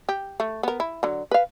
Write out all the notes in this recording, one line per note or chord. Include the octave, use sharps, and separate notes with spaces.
G4
A3
B3 A#4
E4
D3 F#3
B4 F5